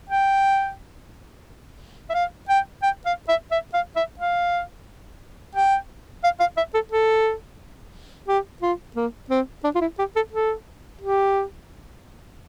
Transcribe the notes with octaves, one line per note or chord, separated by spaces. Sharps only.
G5
E5
F5
G5
G5
F5
E5
E5
F5
E5
F5
G5
F5
F5
E5
A4
A4
G4
F4
A#3
C4
D4
F4
E4
G4
A4
A4
G4